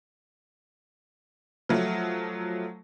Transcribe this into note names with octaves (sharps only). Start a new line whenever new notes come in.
F3 F#3 A3